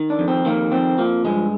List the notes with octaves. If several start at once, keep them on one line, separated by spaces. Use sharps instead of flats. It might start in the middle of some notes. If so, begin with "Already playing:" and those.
Already playing: D#3
D4
F2
C4
D#3 A#3
F2 C4
F3 A#3
G2 G#3